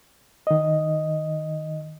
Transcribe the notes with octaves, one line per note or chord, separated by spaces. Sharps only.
D#3 D#5